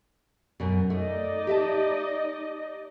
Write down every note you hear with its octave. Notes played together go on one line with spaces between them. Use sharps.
F#2 B2
A3 D#4 D5 D#5
G4 E5 A5